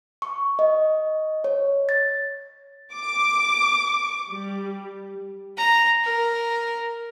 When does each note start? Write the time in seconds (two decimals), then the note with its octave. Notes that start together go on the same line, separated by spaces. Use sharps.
0.22 C#6
0.59 D#5
1.44 C#5
1.89 A6
2.94 D6
4.30 G3
5.57 A#5
6.04 A#4